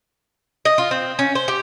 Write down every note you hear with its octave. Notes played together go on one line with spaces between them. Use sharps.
D#5
F4
C4
C#4
C5
G4